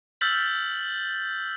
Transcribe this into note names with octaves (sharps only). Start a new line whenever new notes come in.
E6 F6 G6 A6 B6 F#7